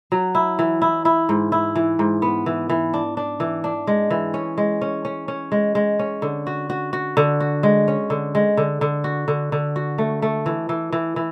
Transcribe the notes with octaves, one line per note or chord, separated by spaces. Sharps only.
F#3
E4
E3
E4
E4
G#2
E4
E3
G#2
B3
E3
E3
D4
D4
E3
D4
G#3
E3
C#4
G#3
C#4
C#4
C#4
G#3
G#3
C#4
D3
F#4
F#4
F#4
D3
F#4
G#3
C#4
D3
G#3
D3
D3
F#4
D3
D3
F#4
A3
A3
E3
E3
E3
E3